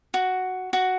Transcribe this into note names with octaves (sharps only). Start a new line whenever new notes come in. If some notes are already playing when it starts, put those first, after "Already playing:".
F#4
F#4